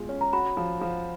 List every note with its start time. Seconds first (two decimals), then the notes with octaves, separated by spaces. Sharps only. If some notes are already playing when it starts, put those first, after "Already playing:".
Already playing: B2 G#3 F4
0.09 C#4
0.21 A#5
0.33 F#4 B5
0.57 F3
0.81 F3